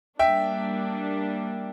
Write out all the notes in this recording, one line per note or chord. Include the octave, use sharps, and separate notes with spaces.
G3 A#3 D4 E5 G5